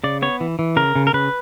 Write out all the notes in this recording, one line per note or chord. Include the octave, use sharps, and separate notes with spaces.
C#3 D5
B3 C#5
E3
E3
C#3 A#4
C#3
A#4
C#3 B4